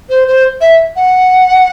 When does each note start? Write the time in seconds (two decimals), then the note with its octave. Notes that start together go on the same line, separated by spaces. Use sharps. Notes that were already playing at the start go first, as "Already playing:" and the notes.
0.10 C5
0.28 C5
0.61 E5
0.96 F#5